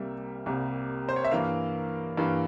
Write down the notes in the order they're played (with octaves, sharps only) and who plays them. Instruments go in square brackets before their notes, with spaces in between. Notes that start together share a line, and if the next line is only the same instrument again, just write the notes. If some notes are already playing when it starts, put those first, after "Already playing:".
Already playing: [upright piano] C2 C3 G3 A#3 E5
C2 C3 G3 A#3
C5
C#5
E5
G2 E3 A#3 F5
G2 E3 A#3